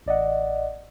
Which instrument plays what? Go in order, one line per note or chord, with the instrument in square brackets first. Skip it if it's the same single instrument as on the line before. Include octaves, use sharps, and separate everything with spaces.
[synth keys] A1 D5 D#5 F#5